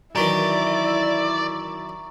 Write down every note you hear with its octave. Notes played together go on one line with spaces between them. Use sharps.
F#2 D#3 E3 E4 D5 A#5 C#6